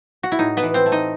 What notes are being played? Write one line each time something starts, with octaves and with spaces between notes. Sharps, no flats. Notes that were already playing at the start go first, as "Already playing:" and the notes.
F#4
E4
A2 D#4
B3 B4
E3
C4 C5
A3
D#4 D#5